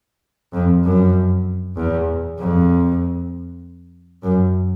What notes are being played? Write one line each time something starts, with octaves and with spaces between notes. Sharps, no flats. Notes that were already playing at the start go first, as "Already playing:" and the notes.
F2
F#2
E2
F2
F#2